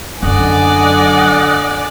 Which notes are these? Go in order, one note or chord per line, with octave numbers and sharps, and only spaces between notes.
F#2 D3 F#3 D5 D#5 F#5 G#5